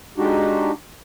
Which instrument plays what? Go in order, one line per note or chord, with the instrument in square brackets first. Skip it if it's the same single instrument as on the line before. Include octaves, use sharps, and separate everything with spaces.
[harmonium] G#3 D4 D#4 F#4 G4